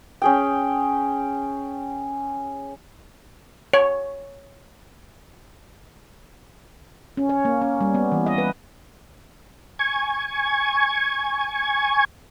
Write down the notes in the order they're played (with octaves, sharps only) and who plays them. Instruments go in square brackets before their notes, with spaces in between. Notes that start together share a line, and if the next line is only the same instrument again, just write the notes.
[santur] C#4 G#4 G5
[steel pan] C#5
[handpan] C#4
C#5
A#3
C#4
G3
B3
E3
D#5
B4
[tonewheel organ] G#5 C#6 G#6